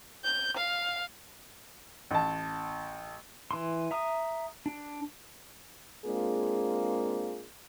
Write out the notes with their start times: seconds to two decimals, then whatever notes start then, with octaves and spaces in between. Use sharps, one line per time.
0.24 G6
0.57 F5
2.11 A1 A5
3.51 E3 C6
3.91 E5 A#5 D#6
4.66 D4
6.06 G#3 A#3 C4 D4 F4 G#4